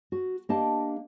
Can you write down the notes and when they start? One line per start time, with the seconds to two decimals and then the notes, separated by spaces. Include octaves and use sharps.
0.12 F#4
0.49 A#3 D4 G4 D#5 A5